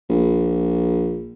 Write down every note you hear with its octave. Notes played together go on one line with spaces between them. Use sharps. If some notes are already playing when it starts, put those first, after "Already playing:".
A#1